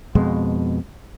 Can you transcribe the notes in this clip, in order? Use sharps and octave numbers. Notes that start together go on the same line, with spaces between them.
F2 B2 G#3